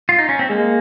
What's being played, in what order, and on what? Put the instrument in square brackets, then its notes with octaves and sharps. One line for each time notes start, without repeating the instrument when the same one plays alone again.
[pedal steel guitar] F4
D#4
C#4
C4
[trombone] G#3 [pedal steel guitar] A#3